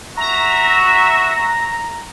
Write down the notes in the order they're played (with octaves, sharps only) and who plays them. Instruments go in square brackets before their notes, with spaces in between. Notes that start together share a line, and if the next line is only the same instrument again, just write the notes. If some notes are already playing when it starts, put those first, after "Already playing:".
[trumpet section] F#4 E5 [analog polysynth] A#5